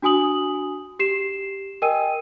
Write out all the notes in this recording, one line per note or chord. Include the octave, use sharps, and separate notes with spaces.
D4 F#4 G#5 D#6 F#7
G4 C7 E7
A#4 D#5 G5 G#5 E6 D#7